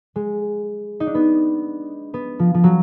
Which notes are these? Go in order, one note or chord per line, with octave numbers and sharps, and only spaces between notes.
G#3
D#4
D4
B3
B3
F3
F3
F#3